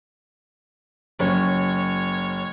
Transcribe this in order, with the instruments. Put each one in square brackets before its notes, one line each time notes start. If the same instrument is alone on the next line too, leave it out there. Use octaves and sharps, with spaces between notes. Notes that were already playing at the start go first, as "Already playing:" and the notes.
[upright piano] F#1 C#4 [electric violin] C#5